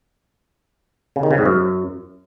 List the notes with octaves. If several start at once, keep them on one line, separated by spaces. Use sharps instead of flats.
C#3
D#3
C#3
G#2
F#2